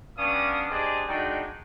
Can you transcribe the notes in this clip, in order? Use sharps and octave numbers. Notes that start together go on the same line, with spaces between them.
G3 B3 C#4 D4 F5 D#6
D4 G4 G#4 C5 D5 D#5
G#3 D4 D#4 F#4 A4 G5